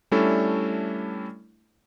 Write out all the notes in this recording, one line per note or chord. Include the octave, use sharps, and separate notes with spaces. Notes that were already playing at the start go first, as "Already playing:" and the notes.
G3 A3 C#4 D4 E4 A4